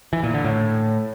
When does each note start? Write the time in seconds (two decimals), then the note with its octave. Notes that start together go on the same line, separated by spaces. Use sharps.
0.13 E3
0.23 A#2
0.34 D3
0.44 A2